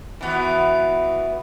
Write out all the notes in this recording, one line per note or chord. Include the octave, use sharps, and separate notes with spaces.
E3 B3 F#4